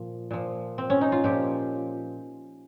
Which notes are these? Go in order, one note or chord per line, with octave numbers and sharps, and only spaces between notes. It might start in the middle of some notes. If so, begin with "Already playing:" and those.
Already playing: A#2 F3
A#2 F3
C4
C#4
D#4
F4
A#2 F3 G4